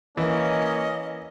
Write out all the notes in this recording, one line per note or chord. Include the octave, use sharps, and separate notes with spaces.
E3 A#3 C#4 D#5